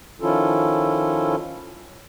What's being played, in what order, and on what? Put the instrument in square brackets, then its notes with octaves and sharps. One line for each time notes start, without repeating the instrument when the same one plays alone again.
[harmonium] D#3 F3 C#4 E4 F4 A4